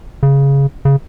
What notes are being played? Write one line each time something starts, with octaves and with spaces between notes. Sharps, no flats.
C#3
C#3